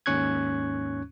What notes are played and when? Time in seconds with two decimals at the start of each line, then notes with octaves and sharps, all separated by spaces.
0.06 D#2 G#2 C#4 C#6 F#6 G#6